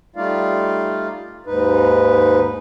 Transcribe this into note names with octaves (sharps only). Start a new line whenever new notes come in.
G3 A3 D#4 F4 D5 F5
D#2 G#2 D#4 B4